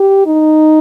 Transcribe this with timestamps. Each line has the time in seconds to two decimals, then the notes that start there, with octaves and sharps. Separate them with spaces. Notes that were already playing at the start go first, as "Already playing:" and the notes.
Already playing: G4
0.26 D#4